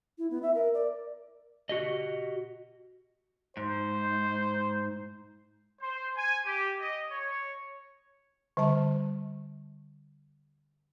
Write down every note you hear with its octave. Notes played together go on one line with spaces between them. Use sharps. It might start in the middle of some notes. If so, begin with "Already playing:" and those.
E4
B3
E5
A#4
D5
F#4 G4 D#5
G#2 C5
C5
G#5
G4
D#5
C#5
D3 G3 A5